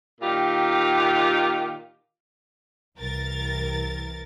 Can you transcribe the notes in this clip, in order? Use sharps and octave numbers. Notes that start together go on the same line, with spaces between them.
A#2 D#3 F4 G4
C2 E3 A#4 A6